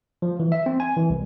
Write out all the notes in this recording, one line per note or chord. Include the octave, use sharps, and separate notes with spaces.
F3
E3
E5
C4
G#5
E3
C2